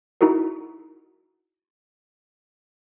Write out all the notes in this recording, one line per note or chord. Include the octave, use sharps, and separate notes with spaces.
D#4 E4 F#4 G#4 A#4